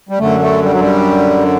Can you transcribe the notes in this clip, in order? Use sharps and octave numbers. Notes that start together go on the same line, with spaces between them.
G3
F#2 D3 A3
A3
G3
F#3
G3